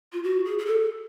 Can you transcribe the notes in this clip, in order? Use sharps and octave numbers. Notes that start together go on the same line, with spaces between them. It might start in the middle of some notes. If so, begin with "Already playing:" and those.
F4
F#4
G#4
G#4
A4